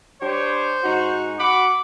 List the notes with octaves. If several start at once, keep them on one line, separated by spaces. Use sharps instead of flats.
D4 G4 C5 C#5
G#2 D#4 F#4
F#4 F#5 B5 D6